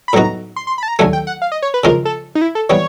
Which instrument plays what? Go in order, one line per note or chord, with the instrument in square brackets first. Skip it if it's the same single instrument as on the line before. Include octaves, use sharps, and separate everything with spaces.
[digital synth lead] B5
[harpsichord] A2 F#3 B3 D#4 F#4 [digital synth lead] A#5
[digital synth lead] C6
C6
B5
A5
A#5
[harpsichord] D#2 D3 F#3 A3 [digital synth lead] G#5
[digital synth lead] G5
F#5
F5
D#5
C#5
B4
[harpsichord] C#3 F3 G#3 C#4 F4 [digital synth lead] A#4
[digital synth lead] A4
D#4
E4
A4
[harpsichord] E3 G3 B3 [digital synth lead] C#5